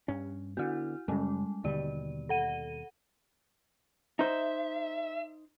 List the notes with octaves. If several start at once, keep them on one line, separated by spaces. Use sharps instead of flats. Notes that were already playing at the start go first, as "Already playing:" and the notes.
G2 C#4
D3 B3 E4 F#4
F#2 C#3 G3 G#3 C#4
D#2 B2 D3 G3 D5
A4 F#5 D#7
D#4 C5 E5